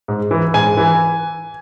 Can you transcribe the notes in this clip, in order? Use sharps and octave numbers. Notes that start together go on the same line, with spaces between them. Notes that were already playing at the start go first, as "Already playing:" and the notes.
G#2
E3
G#2 G#5
E3